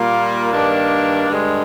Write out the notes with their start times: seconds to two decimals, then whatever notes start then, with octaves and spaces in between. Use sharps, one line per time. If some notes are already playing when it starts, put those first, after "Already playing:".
Already playing: A#2 G3 A#3 F4
0.52 G2 D#3 A#3 D4
1.29 G2 D3 G#3